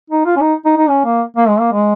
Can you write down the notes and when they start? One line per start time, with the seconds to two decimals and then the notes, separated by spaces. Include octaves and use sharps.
0.10 D#4
0.26 F4
0.36 C#4
0.41 D#4
0.65 D#4
0.77 D#4
0.89 C#4
1.05 A#3
1.37 A#3
1.48 G#3
1.60 A#3
1.73 G#3